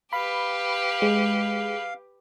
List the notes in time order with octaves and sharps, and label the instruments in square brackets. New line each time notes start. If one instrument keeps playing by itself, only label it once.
[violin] G4 B4 [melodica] F5 [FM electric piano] B5
[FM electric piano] G#3